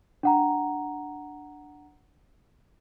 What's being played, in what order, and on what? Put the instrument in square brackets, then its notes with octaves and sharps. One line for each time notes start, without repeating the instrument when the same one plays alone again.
[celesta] D4 F#5 A#5